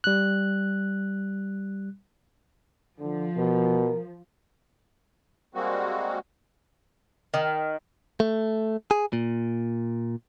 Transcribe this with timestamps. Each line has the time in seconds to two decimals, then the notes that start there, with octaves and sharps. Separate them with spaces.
0.04 G3 F#6
3.00 D3 F3
3.37 B2 A#4
5.55 G3 G#3 A#3 C4 F#4
7.34 D#3
8.20 A3
8.91 G#4
9.13 A#2